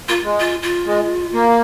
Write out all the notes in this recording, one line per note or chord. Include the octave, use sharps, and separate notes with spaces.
A#3 F4
G#3
F4
F4
G#3
A#3